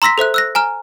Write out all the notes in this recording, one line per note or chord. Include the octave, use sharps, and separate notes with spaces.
A#5 C6 E6 A#6 B6
A4 C5 E5 F#6
E6 F#6 A#6
G#5 A#5 F6